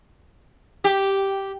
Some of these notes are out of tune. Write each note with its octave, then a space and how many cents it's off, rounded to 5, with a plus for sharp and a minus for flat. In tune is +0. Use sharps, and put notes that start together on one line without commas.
G4 -5